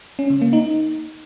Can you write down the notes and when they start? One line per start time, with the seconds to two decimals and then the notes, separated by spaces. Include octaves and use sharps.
0.19 C#4
0.30 C#3
0.42 A#3
0.53 D#4